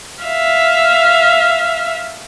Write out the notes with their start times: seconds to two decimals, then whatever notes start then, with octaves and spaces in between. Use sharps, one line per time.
0.23 E5 F5